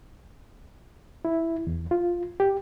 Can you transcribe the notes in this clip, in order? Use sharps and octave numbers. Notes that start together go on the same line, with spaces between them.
E4
E2
F4
G4